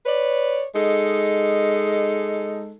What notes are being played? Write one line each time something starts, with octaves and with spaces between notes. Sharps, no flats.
B4 C#5 D5
G#3 D#4 A4